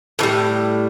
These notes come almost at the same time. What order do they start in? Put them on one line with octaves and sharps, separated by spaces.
A2 E3 G3